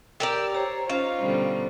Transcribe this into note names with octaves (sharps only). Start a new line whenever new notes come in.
G4 A#4 D5 E6
C5 C#5 A#5
C#4 D#4 F4 C5 F5
B2 D3 G3